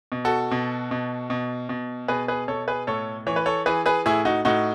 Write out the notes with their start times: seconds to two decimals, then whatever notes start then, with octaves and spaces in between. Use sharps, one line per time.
0.12 B2
0.25 F#4 A4
0.51 B2
0.91 B2
1.30 B2
1.69 B2
2.08 B2 G#4 B4
2.28 G#4 B4
2.48 B2 A4 C#5
2.68 G#4 B4
2.87 A2 A4 C#5
3.27 E3 C#5
3.36 B4
3.46 A4 C#5
3.66 E3 G#4 B4
3.86 G#4 B4
4.06 A2 E4 G#4
4.25 D#4 F#4
4.45 A2 D#4 F#4